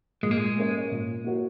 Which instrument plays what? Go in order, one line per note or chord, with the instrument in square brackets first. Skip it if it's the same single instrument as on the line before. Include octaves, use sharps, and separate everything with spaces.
[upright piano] A#2 [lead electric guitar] G#3
[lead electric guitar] A#3
G#3
[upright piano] A#3 C#4 A#4 C#5
A#2
A#3 F#4 A#4 C#5